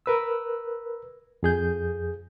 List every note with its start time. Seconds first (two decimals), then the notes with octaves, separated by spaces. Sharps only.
0.06 A#4 B4 E6
1.43 F2 G#4 G6